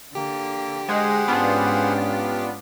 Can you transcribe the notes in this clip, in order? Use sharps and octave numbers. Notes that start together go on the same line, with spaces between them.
D3 A#3 G4
G#3 G#4 C5 F#5
G#2 B3 C#4 D4 F4